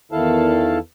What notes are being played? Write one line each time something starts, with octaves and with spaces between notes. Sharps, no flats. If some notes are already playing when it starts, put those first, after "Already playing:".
E2 D#3 E4 A4 F5 A5